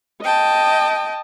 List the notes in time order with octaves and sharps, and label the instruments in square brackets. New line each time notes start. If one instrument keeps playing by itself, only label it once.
[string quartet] D#5 G5 A5